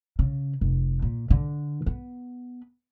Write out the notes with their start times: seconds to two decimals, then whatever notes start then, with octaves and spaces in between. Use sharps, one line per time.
0.19 C#3
0.61 F1
1.02 A#2
1.30 D3
1.86 B3